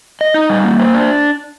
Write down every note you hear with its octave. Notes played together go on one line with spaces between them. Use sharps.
D#5
D#4
G3
A#3
C5
D4